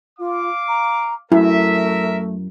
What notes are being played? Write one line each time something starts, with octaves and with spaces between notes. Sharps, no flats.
F4 F5 D6
A#5
F#2 A3 E4 A#4 E5